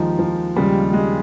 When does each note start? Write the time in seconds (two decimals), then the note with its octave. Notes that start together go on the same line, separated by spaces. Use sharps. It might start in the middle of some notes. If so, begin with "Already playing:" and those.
Already playing: D#2 D#3 F3 G#3 D#4
0.19 F3
0.56 D#2 C#3 G3 G#3
0.93 G#3